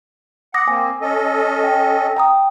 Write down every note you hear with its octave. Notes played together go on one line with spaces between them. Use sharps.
F#5 D6 D#6 A#6
A#3 C4 G#5
C#4 A4 D#5
G5
G5 A#5 D#6